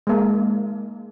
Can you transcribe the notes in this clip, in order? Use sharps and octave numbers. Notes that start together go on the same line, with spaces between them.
G#3 A#3